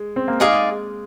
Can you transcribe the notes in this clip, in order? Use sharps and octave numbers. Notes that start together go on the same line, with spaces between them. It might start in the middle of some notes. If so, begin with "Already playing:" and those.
Already playing: G#3
C4
A#3
G#3 D#4 G#4 D5 F5